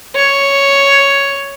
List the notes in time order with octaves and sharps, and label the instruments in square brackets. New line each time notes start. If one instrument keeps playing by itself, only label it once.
[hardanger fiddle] C#5